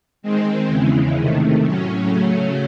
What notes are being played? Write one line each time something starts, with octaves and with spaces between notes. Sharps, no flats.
D#3 G#3 C4
E2 C#3 E3 G#3
C3 D#3 A3
A2 F#3 C#4
C#3 F#3 A3 C#4